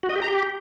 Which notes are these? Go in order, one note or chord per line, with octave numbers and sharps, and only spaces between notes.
F#4
D#5
G4
A#5
G4